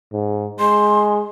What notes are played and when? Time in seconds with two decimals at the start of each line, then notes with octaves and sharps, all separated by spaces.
0.13 G#2
0.60 G#3 C6